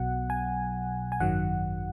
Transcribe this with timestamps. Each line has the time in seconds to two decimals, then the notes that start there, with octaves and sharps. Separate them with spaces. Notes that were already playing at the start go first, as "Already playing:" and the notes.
Already playing: B1 B2 F#3 F#5
0.30 G#5
1.12 G#5
1.20 G#1 F#2 D#3 F#3 F#5